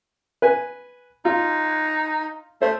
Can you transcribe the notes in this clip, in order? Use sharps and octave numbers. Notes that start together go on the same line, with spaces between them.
B4 G#5
D#4 F4
A3 C5